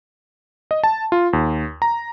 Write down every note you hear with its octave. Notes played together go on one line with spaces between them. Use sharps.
D#5
A5
F4
D#2
A#5